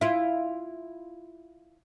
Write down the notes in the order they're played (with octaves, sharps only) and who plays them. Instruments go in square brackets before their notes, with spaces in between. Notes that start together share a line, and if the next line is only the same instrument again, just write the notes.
[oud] E4 F4